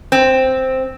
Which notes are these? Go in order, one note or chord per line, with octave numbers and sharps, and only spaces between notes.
C4